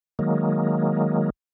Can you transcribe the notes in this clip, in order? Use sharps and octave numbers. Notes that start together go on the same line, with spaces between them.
D#3 F#3 G#3 A#3